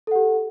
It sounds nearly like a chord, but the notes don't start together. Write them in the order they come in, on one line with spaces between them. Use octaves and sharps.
A4 F#5 G4